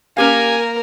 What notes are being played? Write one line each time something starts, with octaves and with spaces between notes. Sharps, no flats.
A#3 C#4 G4 A#4 F5 G#5